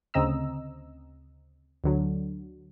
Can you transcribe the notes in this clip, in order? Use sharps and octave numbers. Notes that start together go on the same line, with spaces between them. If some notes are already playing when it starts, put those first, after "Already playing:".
D2 C#3 C4 D#5 A#5 E6
D2 D3 F#3